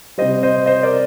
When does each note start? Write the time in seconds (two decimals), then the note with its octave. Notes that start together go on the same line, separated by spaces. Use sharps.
0.18 C3 G3 C5 D#5
0.43 C5 D#5
0.66 C5 D#5
0.83 A#4 D5